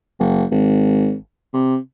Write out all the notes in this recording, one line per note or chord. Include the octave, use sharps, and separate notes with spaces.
F#1
G#1
C3